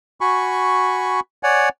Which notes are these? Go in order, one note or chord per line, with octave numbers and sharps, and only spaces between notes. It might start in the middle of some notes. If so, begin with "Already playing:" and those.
F#4 G#5 B5 C#6
C#5 D5 F#5 G#5